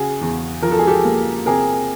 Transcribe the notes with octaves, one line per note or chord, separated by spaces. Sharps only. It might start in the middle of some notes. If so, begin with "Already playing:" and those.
Already playing: C#3 F#4 G#4
E2
F3 A#4
A4
G#4
G4 A4
A#3
C3 G#4 A#4